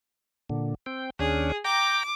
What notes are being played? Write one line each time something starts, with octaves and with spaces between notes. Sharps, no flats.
A#2 D3
C4 G5
D#2 C#4 D4 G#4
G5 A#5 D6